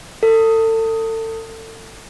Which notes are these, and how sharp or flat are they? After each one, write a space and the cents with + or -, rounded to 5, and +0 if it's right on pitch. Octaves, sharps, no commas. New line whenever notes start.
A4 +30